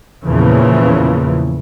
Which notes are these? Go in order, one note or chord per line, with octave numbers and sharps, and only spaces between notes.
E2 A#2 C#3 E3 F3